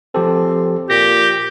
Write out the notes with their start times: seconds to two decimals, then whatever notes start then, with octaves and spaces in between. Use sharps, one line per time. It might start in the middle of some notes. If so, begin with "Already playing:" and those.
0.15 F3 C4 G4 A4
0.90 A#2 G4 A#6